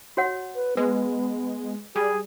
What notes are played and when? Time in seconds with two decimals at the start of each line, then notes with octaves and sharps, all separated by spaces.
0.17 F#4 C#5 F#5
0.55 B4
0.77 G#3 B3 B4
1.96 G3 G#4